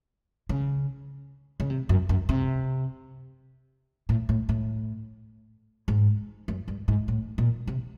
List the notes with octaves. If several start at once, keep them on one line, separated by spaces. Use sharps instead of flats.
C#3
C#3
C3
F#2
F#2
C3
A2
A2
A2
G#2
F#2
G2
G#2
A2
A#2
C3